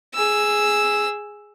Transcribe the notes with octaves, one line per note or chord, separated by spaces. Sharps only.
G#4 E6